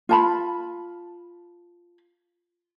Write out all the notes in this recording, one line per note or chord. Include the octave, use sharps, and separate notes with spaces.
F4 A5 B5